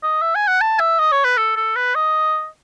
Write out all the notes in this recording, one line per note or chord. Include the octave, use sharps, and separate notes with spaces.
D#5
E5
G#5
F#5
A5
E5
D#5
C#5
B4
A4
A4
B4
D#5